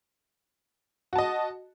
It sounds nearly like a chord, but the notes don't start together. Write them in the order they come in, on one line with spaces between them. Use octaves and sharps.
F#4 A5 D#5